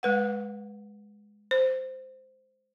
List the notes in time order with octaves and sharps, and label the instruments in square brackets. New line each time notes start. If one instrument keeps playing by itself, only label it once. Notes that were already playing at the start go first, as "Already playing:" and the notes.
[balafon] G#3 B4 F#5
C5